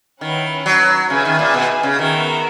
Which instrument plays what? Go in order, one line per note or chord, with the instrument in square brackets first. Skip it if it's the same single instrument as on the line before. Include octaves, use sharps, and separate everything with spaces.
[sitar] D#3 [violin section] C#4 E4 B4 F#5
[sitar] F#3
[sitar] C#3 [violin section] G#4 B4 E5 G#5
[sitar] D#3
A#2
B2
C#3
[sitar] D#3 [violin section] B3 F#4 A#4 E5